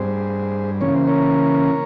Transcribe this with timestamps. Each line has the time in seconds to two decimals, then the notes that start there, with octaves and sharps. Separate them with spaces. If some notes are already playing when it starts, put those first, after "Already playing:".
Already playing: G2 G3 C4 G#4 C5
0.81 C#3 E3 A#3 C#4 C#5
0.95 C5
1.07 A#4 C#5